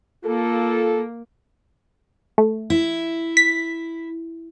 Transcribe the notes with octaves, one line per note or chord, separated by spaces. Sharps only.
A#3 F4 A4
A3
E4
B6